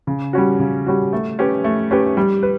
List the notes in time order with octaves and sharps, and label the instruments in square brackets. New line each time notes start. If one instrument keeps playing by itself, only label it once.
[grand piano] C#3
G3 C#4 F#4
C#3
G3 C#4 F#4
A3
C#4 G4 B4
A3
C#4 G4 B4
G3
B4